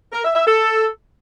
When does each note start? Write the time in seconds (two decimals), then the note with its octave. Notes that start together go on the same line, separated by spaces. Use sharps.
0.13 A#4
0.24 E5
0.35 E5
0.46 A4